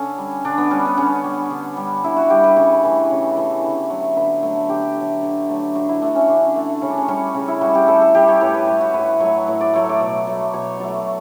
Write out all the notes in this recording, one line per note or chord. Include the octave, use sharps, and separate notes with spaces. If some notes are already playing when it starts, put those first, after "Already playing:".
Already playing: D3 C#4 A4
G3
D3 D4
B3
G3 C#4
B3
D3 C#4
G3
D3
G3
D3 E4
F#4
G3 G4
B4
C#3 C#5
E3 A3
C#3
E3 A3
D3
F#3 A3
D3 B4
F#3 A3
D3 G4
F#3 A3
D3
F#3 A3
D3 F#4
E4
A3 D4
C#4
D3 D4
A3
C#3 C#4
D4
C#4
G3 C#4
C#3
E4
G3 F#4
G4
A2 A4
A4
G3 G4
C#5
A2 B4
B4
G3
F#4
A2 B4
F#3 A3 C#5
A2
D5
F#3 A3 C#5
D5
B2
F#3 A3
B2 C#5
F#3 A3 D5